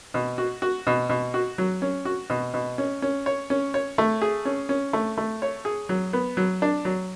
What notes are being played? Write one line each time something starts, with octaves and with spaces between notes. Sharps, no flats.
B2
F#4
F#4
B2
B2
F#4
F#3
C#4
F#4
B2
B2
C#4
C#4
C#5
C#4
C#5
A3
G#4
C#4
C#4
A3
A3
C#5
G#4
F#3
B3
F#3
D4
F#3